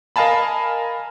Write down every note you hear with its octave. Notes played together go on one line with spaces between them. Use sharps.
A#4 D#5 F5 G#5 A5 B5